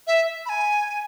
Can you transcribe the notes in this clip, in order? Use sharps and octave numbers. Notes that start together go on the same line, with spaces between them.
E5
B5
G#5